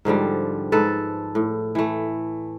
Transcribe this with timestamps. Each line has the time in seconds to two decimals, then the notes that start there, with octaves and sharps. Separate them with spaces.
0.05 G#2 D3 F3 G3
0.72 G#2 A4 B4
1.35 A2
1.75 E3 A3